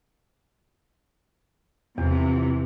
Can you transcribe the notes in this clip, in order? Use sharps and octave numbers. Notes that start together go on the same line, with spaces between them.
E2 C3 E3 F3